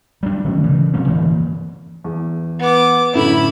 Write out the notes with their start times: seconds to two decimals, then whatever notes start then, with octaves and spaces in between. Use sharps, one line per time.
0.23 G3 G#3 D4
0.44 D#3 F#3 A3 C#4
0.64 C#3 E3 G3
0.94 C3 F#3 A#3 C#4
1.07 D1 G2 E3 A#3
2.04 E2
2.60 B3 D6
3.14 F#2 A2 D3 E4 B5